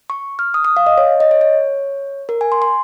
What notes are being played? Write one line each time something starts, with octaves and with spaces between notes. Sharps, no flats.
C#6
F6
D#6
D#6
F5
D#5
C#5
D#5
C#5
C#5
A#4
G#5
C6
C6